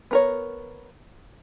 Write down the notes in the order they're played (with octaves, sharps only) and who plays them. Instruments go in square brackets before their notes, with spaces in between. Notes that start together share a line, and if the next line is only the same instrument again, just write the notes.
[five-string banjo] B3 A#4 C#5